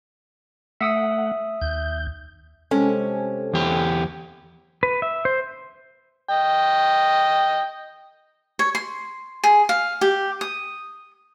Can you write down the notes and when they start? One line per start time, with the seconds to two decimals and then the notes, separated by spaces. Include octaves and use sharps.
0.81 A3 E5 F#5 D#6 E6
1.62 D#2 G6
2.71 C3 G#3 C#4 A4 G#5
3.53 E2 G4
4.83 B4
5.02 E5
5.25 C5
6.29 D#5 G5
8.59 C#5
8.75 C6
9.44 G#4
9.69 F5
10.01 G4
10.41 D#6